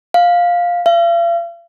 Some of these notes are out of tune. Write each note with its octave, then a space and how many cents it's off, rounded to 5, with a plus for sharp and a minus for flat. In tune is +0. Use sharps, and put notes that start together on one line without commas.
F5 +5
F5 -45